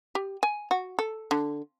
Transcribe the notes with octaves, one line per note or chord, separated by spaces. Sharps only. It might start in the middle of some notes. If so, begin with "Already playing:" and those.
G4
G#5
F#4
A4
D3